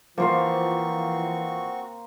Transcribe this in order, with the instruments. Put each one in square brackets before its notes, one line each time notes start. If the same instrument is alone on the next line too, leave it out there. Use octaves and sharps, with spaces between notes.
[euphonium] E3 [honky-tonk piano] F3 [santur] A#3 C5 F5 [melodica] C4 F#4 C#6